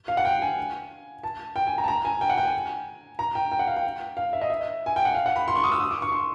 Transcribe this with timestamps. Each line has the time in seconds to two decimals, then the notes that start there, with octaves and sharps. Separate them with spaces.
0.08 F5
0.17 F#5
0.25 G5
0.42 G#5
1.23 A5
1.56 G5
1.67 G#5
1.78 A#5
1.84 A5
1.88 A#5
2.05 G#5
2.21 G5
2.30 F#5
2.38 G5
2.45 G#5
3.19 A#5
3.35 G5
3.52 G5
3.59 F#5
3.67 F5
3.76 G5
4.17 F5
4.33 E5
4.42 D#5
4.50 E5
4.86 G#5
4.96 G5
5.05 F#5
5.15 F5
5.26 F#5
5.36 B5
5.48 C6
5.56 C#6
5.64 D#6
5.72 E6
5.80 D#6
5.91 D6
6.02 C#6
6.12 C6